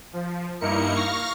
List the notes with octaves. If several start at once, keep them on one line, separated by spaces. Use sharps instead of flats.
F3
G2 A#3 D#4 E4 A#4 C#7
F5 C#6 F6 A#6